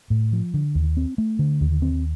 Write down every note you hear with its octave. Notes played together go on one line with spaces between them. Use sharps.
A2
F3
D3
D#2
C4
A3
D3
D#2
C4